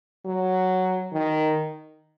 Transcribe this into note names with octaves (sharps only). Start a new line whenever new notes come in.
F#3
D#3